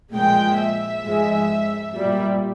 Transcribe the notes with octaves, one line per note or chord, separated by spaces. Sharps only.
A#2 F3 G#3 G5
E5
G#2 F3 G#3
A#2 G3